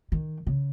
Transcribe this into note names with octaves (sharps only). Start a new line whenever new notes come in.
D#3
C#3